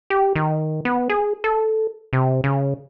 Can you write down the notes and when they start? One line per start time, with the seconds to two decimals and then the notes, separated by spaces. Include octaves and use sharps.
0.10 G4
0.35 D#3
0.85 B3
1.10 G#4
1.44 A4
2.13 C3
2.44 C#3